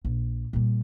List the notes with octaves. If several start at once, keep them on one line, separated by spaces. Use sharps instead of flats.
A#1
A#2 G3